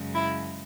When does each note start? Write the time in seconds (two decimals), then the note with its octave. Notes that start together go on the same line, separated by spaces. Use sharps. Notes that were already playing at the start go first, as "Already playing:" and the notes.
Already playing: F#2 C#3 G#3
0.14 E4